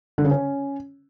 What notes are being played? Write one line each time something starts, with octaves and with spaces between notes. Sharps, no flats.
D3
C#3
C#4